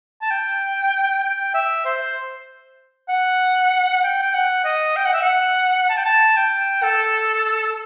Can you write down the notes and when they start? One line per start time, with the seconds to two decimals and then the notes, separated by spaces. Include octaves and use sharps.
0.22 A5
0.30 G5
1.23 G5
1.54 E5
1.85 C5
3.09 F#5
4.03 G5
4.22 G5
4.34 F#5
4.65 D#5
4.96 G5
5.06 F#5
5.13 E5
5.23 F#5
5.89 A5
5.97 G5
6.05 A5
6.37 G5
6.83 A4